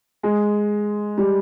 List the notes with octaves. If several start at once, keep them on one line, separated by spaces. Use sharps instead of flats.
G#3
G3